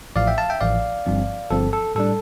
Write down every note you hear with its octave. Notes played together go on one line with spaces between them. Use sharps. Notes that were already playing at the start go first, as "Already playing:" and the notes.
A1 A2 F3 D5 F5
E5 G5
F5 A5
E5 G5
A1 A2 F3 D5 F5
G1 G2 F3 C4
G1 G2 F3 C4 A4
A4
A2 G3 D4 A4